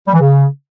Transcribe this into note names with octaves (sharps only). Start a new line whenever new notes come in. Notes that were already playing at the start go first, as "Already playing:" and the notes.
G3
E3
C#3